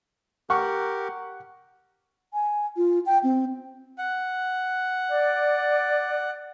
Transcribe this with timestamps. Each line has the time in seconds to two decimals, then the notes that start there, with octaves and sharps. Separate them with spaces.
0.50 G4 A#4 F#5 C#6
2.33 G#5
2.77 F4
3.06 G5
3.23 C4
3.98 F#5
5.11 D5